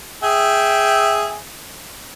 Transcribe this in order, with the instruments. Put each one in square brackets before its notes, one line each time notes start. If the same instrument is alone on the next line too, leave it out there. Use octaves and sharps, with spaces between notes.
[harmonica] G#4 E5 G5